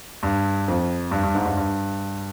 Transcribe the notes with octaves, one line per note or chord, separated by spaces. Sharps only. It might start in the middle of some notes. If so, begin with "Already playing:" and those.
G2
F2
G2
G2
G#2
G2
G2